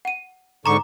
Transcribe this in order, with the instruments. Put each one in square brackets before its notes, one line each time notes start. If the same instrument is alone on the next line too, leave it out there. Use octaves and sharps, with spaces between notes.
[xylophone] F#5 D#7
[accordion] G#2 D3 C#6 [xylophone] A#5 D6